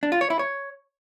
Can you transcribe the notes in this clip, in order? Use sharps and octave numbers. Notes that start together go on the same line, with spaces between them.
D4
F4
C#5
E4
C#5